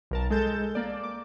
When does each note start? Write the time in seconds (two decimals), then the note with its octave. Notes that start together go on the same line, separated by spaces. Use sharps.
0.11 B1 A#4 A5
0.30 G#3 A4 G6 A6 E7
0.75 A#3 D5
1.03 D6